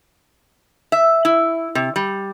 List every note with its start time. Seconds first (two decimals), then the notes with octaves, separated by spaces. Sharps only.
0.92 E5
1.25 E4
1.75 C3
1.96 G3